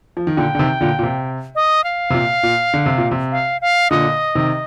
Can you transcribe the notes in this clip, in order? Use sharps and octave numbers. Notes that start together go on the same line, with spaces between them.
F3
D#3
A#2 D3 G5
D3
C3 D#3
A#2 D3
A#2
C3
D#5
F5
C3
A#2
A#2
D3
C3
A#2
C3
F5
F5
A#2 D3 D#5
C3 D#3